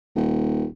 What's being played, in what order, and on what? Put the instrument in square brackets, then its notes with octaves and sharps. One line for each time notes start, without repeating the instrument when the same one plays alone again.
[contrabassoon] D#1